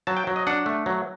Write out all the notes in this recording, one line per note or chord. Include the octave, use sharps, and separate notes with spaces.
F#3 A5
G5
F#3
D#5
D4 F#5
A3
F#3